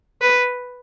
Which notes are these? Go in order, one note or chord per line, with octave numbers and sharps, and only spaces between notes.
B4